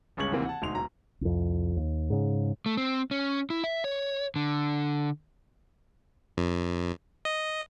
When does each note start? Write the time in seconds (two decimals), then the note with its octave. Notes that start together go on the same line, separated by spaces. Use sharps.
0.17 G1 C#2 C#3 C#6 G#6 F#7
0.32 D2 C3 D#3 E3 A#3 C4
0.45 F#5 A5
0.62 E1 D2 D#4 C6 F7
0.75 D1 A#5
1.21 C2 F2
1.77 D#2
2.10 G#2 C#3
2.66 A3
2.77 C4
3.11 C#4
3.50 E4
3.64 E5
3.84 C#5
4.36 D3
6.37 F2
7.25 D#5